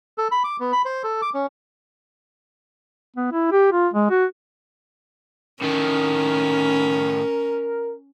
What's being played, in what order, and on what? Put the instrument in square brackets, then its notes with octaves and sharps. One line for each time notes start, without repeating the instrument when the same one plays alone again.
[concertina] A4
B5
D6
B3
B5
C5
A4
D6
C#4
[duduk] B3
E4
G4
F4
G#3
F#4
[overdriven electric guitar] A2 D#3 [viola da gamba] C#4 [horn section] A#4